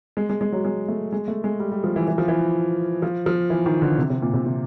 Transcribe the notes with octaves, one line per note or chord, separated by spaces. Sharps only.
G#3
G#3
G#3
F#3
G#3
A3
G#3
A3
G#3
G3
G3
F3
E3
E3
F3
E3
F3
F3
E3
D#3
D3
C3
C3
A#2
C3
C3